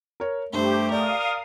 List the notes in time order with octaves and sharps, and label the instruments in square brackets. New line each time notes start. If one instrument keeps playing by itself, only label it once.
[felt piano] A#4 C#5
[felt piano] G2 [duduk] A3 [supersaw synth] G4 [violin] C5
[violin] A#4 [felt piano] D5 [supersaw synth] F5 D#6